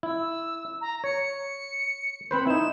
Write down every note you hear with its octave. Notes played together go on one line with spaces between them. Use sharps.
E4 E6
A#5
C#5 C#7
C4 B4 C5 B5
D#4 E4 E7